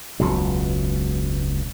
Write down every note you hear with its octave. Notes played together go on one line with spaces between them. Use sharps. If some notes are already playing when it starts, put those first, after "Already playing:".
E1 C#2 B2 F#3